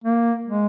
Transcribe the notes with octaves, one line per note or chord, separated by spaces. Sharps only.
A#3
G#3